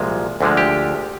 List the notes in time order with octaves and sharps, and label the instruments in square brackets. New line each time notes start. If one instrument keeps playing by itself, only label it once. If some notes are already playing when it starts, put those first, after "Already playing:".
Already playing: [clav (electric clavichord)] C2 A#2 F3 G#3
D2 D3 F3 G#3
G4